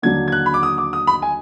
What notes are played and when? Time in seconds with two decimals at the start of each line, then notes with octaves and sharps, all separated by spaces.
0.02 D#2 D3 F#3 D4 G#6
0.28 G#6
0.32 F#6
0.46 B5
0.54 D6
0.63 D#6
0.78 D6
0.93 D#6
1.07 B5
1.22 G#5